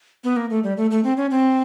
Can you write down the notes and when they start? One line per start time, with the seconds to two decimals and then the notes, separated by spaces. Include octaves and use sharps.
0.24 B3
0.36 A#3
0.50 A3
0.64 G3
0.77 A3
0.91 A3
1.04 C4
1.17 C#4
1.31 C4